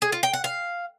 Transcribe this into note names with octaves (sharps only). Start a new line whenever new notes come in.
G#4
F4
G5
F#5
F5